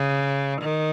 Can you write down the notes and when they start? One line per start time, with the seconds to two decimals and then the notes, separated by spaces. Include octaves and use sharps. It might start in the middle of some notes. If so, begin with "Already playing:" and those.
Already playing: C#3
0.62 D#3